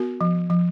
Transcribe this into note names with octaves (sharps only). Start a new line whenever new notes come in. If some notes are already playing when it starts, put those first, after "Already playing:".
Already playing: B3 F#4 A#4
F3
F3